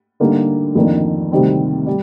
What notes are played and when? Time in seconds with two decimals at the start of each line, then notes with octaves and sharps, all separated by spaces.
0.20 D3 G3 A#3 D#4
0.75 F2 D#3 A#3 D4
1.31 D2 C3 D#3 G3 C4
1.86 G3